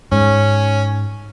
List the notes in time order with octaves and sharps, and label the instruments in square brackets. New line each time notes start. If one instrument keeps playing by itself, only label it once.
[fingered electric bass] G#2 [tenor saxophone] C#4